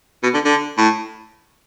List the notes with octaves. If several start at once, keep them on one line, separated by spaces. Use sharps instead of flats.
B2
D3
D3
A2